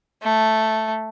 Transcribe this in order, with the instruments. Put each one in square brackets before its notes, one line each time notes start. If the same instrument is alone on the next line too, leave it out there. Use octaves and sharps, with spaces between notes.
[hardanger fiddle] A3